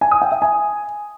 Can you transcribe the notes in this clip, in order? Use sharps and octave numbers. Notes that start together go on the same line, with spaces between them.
G#5
D#6
G5
E5
G#5